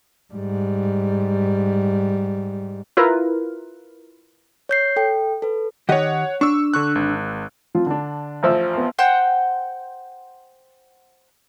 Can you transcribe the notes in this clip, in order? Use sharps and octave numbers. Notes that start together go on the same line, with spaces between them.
G#2 G3
E4 F4 A#4 B4
C#5 G6 C7
A4 G5
A4 B4
D#3 G4 C#5 D#5 F#5
D4 C#6 E6
D3 C#6 F#6
G#1
F3 C4 F4
D3 D4
A1 F3 E6
B3 C6
C5 F#5 G5